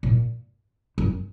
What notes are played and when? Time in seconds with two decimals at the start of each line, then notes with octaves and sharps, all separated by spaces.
0.03 A#2
0.98 F#2